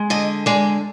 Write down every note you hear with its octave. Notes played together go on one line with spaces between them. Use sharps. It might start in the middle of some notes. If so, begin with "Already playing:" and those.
Already playing: G#3
D3 D#5
G#3 D5